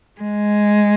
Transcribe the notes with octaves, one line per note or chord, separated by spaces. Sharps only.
G#3